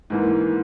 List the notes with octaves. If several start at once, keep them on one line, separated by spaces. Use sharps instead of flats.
G#2 E3 A#3